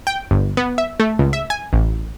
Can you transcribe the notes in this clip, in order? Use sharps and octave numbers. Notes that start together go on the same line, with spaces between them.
G5
G1
B3
E5
A3
C#2
E5
G#5
A1